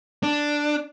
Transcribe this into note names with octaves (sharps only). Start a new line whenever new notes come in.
D4